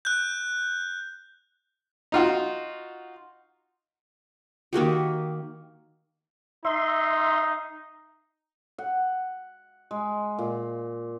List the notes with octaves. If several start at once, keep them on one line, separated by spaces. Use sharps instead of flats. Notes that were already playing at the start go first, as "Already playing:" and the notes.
F#6 G6
D#4 F4 F#4
D#3 A#3 F#4 G4
D#4 E5 C6
F#5
G#3
A#2